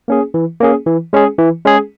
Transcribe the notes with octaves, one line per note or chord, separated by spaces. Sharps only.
A#3 C#4 G#4
E3
A#3 C#4 G#4
E3
G#3 C#4 G#4
E3
G#3 C#4 G#4